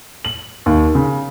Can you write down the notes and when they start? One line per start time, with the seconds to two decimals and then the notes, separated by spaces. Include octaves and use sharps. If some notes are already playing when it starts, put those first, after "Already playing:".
0.25 F#7
0.66 D#2
0.95 C#3